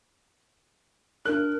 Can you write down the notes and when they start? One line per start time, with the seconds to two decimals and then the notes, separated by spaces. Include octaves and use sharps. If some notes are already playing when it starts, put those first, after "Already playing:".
1.25 D4 A#4 F#6